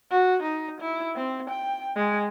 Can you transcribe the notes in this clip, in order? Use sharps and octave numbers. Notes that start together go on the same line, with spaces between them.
F#4
D#4
E4
C4
G5
G#3